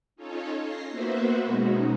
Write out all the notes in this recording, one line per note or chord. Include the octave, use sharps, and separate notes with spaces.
C#4 D#4 F4 A4 C#5
A#6 C7
A#3 B3 F#4 B4 C5 E5
B2 G#3 C#4 D#4 F#4